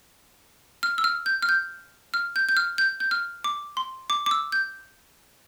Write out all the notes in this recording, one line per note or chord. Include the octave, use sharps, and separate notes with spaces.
F6
E6
F6
G6
F6
G6
F6
G6
G6
F6
G6
G6
F6
D6
C6
D6
D6
E6
G6